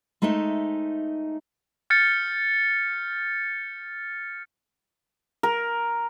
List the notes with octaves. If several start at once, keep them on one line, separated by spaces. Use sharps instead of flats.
G#3 A3 D#4 C5 E5
F6 G6 A6 C#7
A#4